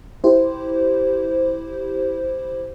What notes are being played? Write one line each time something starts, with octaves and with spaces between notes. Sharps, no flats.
E4 G4 C5